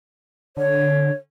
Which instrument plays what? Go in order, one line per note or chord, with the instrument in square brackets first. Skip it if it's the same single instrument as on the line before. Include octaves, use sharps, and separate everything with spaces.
[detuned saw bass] D3 [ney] C#5